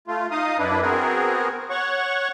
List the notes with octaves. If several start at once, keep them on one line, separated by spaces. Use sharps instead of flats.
A3 F4
D#4 D#5 F5 D#6
F#2 D4 E4 B4
B3 C4 F#4 G#4 A#4
C#5 F#5 C#6